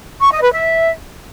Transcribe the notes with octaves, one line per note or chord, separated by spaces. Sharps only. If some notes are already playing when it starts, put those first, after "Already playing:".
C#6
D#5
B4
E5